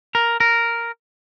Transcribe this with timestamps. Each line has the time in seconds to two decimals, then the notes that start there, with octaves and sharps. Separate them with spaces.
0.15 A#4
0.40 A#4